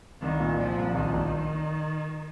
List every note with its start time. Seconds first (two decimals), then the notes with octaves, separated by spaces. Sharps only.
0.22 C2 D#3
0.40 A#2
0.58 A#2 F3
0.78 C2
0.95 A#1 D#3
1.14 A#1